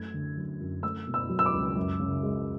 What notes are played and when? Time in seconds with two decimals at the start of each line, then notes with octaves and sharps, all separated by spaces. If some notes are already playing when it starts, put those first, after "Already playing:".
Already playing: F#2 A3 G#6
0.14 D3
0.37 F#3
0.61 F#2
0.83 A3 E6
1.07 B2
1.14 E6
1.29 F#3
1.39 E6
1.46 D6
1.53 C#2
1.77 F#2
2.00 C#3
2.23 G#3